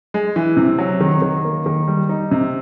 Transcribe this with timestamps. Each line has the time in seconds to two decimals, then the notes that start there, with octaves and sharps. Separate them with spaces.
0.14 G#3
0.36 E3
0.57 C3
0.79 F#3
1.01 D#3
1.22 D#3
1.45 A#3
1.66 D#3
1.88 G3
2.09 D#4
2.31 C3